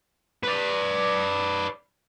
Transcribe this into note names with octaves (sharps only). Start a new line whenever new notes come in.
B4 D5